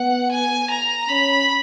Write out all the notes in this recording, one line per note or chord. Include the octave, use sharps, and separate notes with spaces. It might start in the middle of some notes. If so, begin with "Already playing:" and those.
Already playing: B3 F#5
G#5
A#5
C#4 B5